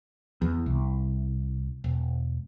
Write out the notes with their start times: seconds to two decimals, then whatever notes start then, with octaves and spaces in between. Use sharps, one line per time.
0.42 E2
0.66 C2
1.84 E1